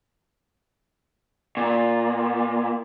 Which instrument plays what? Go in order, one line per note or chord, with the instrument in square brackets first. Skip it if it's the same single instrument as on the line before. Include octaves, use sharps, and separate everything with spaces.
[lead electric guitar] A#2